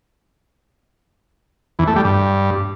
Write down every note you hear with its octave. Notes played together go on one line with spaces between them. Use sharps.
E2
A3
G3
G2